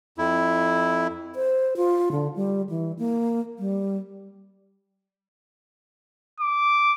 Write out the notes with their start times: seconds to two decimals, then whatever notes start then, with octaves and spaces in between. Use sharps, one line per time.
0.18 F2 E4
1.36 C5
1.77 F4
2.12 D3
2.36 G3
2.70 E3
2.99 A#3
3.59 G3
6.40 D6